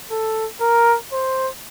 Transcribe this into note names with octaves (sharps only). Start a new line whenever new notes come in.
A4
A#4
C5